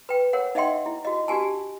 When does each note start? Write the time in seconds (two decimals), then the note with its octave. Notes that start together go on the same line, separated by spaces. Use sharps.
0.09 B4 G5
0.33 A#4 C#5 F#5
0.55 D#4 D#5 E5 F#5 G5 C6
0.86 E4
1.05 F#4 D#5
1.28 D4 F#4 G4 G#5 A5